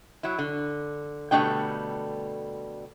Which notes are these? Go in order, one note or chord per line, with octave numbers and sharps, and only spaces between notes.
F#3 E4
D3
B2 D3 G3 A3 D4 G5